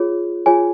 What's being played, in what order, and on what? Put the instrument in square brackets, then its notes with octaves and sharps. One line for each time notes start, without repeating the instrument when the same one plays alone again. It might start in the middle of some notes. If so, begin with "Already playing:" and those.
Already playing: [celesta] F4 G#4 C#5
F4 G#4 C#5 G#5